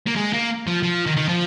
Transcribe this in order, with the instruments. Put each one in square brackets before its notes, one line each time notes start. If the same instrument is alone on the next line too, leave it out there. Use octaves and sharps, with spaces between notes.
[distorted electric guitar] A#3
G#3
A#3
F3
F3
D#3
D#3
F3